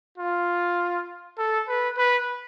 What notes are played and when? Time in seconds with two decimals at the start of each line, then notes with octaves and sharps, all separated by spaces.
0.18 F4
1.38 A4
1.68 B4
1.98 B4